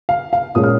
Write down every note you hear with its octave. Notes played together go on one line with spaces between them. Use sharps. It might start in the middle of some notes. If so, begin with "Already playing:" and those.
F5
F5
A#2 G#3 C#4 D#6
F6